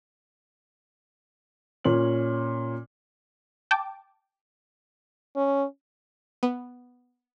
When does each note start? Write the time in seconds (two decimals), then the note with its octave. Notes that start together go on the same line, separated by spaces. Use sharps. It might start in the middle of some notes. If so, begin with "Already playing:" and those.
1.85 A#2 C#4 F#7
3.71 G5 A5 D6
5.36 C#4
6.43 B3